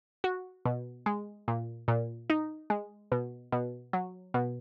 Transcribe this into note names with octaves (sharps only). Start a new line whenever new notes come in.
F#4
B2
G#3
A#2
A#2
D#4
G#3
B2
B2
F#3
B2